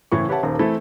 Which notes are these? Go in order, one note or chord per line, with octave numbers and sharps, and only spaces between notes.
F#1 A2 E3 C#6
G4 B4 C#5 E5 F#5 A5
D#1 D#2 C5
E3 A3 C4 E4 A4